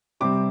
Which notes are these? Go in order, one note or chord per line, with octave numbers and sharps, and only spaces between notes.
C3 G3 C4 D6